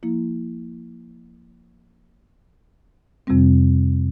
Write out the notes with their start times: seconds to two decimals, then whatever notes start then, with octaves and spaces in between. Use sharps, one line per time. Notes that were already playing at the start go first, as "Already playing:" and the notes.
0.03 F3 A#3 E4
3.27 F2 C3 G3 C4